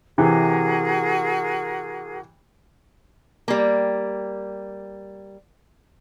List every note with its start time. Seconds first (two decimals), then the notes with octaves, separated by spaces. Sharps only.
0.18 C3 E3 F#4 G#4 A#4
3.48 G3 A#3